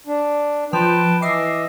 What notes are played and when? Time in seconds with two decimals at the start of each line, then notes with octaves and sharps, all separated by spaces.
0.07 D4
0.73 F3 B4 G5 A5
1.22 E3 D#5 E5 D6 C7